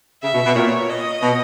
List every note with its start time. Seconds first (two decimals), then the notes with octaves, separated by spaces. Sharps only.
0.23 C#3 E5
0.34 B2
0.46 B2
0.55 A#2 C#5
0.89 D#5
1.22 B2